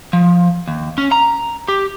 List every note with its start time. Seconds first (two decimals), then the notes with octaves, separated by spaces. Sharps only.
0.13 F3
0.68 D#2
0.98 C#4
1.12 A#5
1.68 G4